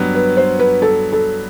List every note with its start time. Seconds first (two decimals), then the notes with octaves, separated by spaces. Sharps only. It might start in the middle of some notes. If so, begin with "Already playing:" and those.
Already playing: G2 F#3 B3
0.15 B4
0.37 C5
0.59 B4
0.82 A4
1.12 A4